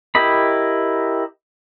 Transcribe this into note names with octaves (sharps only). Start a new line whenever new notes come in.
E4 G4 A#4 D#5 B5